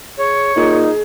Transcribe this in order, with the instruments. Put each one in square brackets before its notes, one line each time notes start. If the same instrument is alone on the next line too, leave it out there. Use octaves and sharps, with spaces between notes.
[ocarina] G#4 [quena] C#5
[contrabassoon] A#2 [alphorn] D#4 [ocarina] G#4